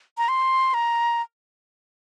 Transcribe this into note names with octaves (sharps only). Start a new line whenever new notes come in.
A#5
C6
A#5